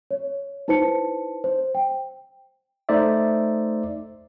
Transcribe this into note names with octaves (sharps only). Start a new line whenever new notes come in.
C#5
D#4 E4 B4 C5 A5 C#7
C5
G5
A3 D#4 C5 D5 E5